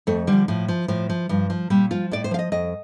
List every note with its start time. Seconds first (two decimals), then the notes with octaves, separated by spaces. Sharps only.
0.07 F2 A3
0.27 D3 F3 G3
0.48 A2 F3
0.68 F3
0.88 A2 F3
1.09 F3
1.29 G2 F3
1.50 F3
1.70 A#2 G3
1.91 F3 F4
2.11 A2 D5
2.24 C5
2.31 F3 F5
2.39 D#5
2.52 F2 D#5